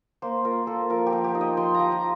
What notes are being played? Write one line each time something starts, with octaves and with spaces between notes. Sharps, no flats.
A#3 C5
F4 A#4
A#3 A4
F3 A#4
G4
F3
G4
D#4
D#5
F3 C6
A#5
F3
A#5